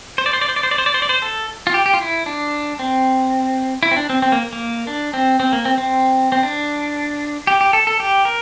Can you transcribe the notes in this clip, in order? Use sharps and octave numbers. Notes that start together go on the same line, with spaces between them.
C5
D5
C5
D5
C5
D5
C5
D5
C5
D5
C5
D5
C5
A4
F4
G4
G4
F4
E4
D4
C4
E4
C4
D4
C4
C4
A#3
A#3
D4
C4
C4
A#3
C4
C4
C4
D4
G4
G4
A4
A4
G4
A#4